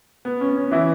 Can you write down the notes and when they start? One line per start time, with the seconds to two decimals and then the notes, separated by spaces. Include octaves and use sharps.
0.25 B3
0.41 C#4
0.56 C#4
0.71 E3 E4